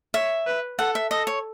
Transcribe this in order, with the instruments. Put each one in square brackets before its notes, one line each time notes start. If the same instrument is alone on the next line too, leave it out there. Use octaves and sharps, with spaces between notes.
[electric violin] C#5 [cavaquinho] E5
[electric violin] B4
[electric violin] A4 [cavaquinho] F#5
[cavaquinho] E5
[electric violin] A4 [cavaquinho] D#5
[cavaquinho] C#5